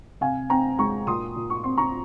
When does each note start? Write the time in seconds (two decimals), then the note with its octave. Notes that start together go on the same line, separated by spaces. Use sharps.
0.21 C3 F5 G#5
0.50 C4 G5 A#5
0.78 G#3 A#5 C#6
1.07 A#2 C6 D#6
1.36 A#2
1.50 C#6
1.64 C4 C6
1.77 A#5 C#6